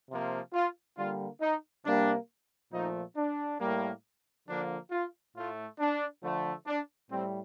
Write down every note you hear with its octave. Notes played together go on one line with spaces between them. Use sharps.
C3 F3 A#3
F4
D3 G3 A#3 F4
D#4
C3 G3 A#3 D4
A#2 F3 A3 D#4
D4
A2 G3 A#3
D3 F3 A#3 D4
F4
A2 A3 F4
D4
D3 F3 A3
D4
A2 G3 C4